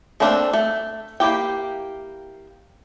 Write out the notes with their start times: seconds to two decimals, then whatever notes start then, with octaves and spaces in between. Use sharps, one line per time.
0.20 A3 A#3 C4 D4 A4
0.53 A3
1.20 A#3 E4 G4 G5